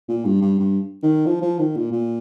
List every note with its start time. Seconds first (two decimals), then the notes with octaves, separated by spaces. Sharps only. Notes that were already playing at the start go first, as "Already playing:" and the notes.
0.09 A#2
0.25 G2
0.41 G2
0.59 G2
1.03 D#3
1.26 F3
1.42 F3
1.59 D#3
1.76 A#2
1.92 A#2